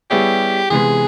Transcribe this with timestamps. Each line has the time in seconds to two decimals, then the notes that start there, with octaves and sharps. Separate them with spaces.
0.10 G3 B3 E4 G4 G#4 C#5
0.70 C3 E3 G#3 B3 G#4